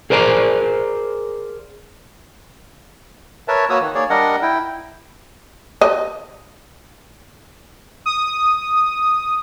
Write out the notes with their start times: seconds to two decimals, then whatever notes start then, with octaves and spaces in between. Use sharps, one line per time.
0.10 G#4 A#4 C5 D5 A5 A#5
3.48 A#4 B4 C#5 E5 A5
3.70 A#3 F#4 B4 C#5 D#6 E6
3.81 D#3
3.95 A#3 G#4 C#5 D5
4.10 G3 D4 A#4 D#5 F#5
4.42 E4 G5
5.81 D#5
8.06 D#6